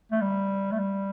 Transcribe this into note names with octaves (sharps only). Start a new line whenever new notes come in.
A3
G3
A3
G3